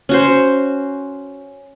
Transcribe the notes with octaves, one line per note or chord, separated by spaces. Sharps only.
C#4 F#4 C5